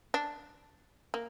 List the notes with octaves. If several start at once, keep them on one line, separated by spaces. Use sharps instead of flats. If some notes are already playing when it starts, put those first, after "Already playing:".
D4
A#3